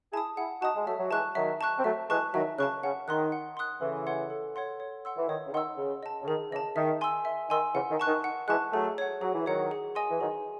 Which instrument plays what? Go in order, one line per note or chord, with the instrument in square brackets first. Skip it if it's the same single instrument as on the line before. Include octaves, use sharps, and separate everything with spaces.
[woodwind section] E4 G#4 [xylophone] A5 D#6
[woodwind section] E4 G#4 [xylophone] F#5
[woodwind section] D#4 F#4 [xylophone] A5 D#6
[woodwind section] G#3
[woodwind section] F#3 A3 [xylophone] E5
[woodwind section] F#3
[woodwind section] E3 G#3 [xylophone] A5 C#6 F#6
[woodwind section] D#3 F#3 [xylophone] E5
[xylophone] A5 C#6 F#6
[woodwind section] C4
[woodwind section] F#3 A3 [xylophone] E5
[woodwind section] E3 G#3 [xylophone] A5 C#6 F#6
[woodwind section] D#3 F#3 [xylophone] E5
[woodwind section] C#3 [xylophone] A5 C#6 F#6
[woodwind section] C#3 [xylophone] F#5
[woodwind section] D#3 [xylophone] C6 D#6 F#6
[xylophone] F#5
C6 D#6 F#6
[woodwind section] C#3 E3 [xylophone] A4
[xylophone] C#5 F#5 C6
A4
C#5 F#5 C6
C#5
F#5 C6 E6
[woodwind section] E3
[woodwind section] D#3 [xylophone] C#5
[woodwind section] C#3
[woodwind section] D#3 [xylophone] F#5 C6 E6
[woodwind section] C#3 [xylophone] G#4
[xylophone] D#5 A5
[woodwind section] C#3
[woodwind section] D#3 [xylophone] G#4
[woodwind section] C#3 E3 [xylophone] D#5 A5
[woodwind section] D#3 [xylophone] E5
[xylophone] G#5 C6 E6
E5
[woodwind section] D#3 [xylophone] G#5 C6 E6
[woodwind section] C#3 E3 [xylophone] F#5
[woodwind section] D#3
[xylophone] A5 C#6 F#6
[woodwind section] D#3
[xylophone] F#5
[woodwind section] E3 G#3 [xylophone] A5 C#6 F#6
[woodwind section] F#3 A3 [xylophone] G#4
[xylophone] C#5 F#5
[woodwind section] F#3 [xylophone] G#4
[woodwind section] E3
[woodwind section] D#3 F#3 [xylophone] C#5 F#5
[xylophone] G#4
D#5 G#5 C6 D#6
[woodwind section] E3
[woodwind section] D#3 F#3 [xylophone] G#4